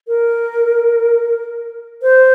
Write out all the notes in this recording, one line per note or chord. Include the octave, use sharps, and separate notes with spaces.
A#4
C5